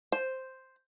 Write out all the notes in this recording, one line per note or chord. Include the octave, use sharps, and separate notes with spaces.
C5